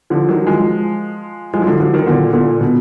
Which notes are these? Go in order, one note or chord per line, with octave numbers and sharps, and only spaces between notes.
D3 F3
D#3 F#3
F3 G#3
F3 G#3
F#3
D3 F3
D3 F3
D#3 F#3
A#2 D3
A#2 D3
B2